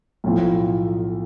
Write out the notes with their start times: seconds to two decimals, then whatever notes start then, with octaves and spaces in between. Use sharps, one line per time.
0.24 B1 A2 F3